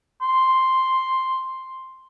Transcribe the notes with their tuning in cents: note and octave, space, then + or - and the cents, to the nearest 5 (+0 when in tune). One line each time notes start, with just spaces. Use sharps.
C6 +0